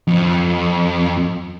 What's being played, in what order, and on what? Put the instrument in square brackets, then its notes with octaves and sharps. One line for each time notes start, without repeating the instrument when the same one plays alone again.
[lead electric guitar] F2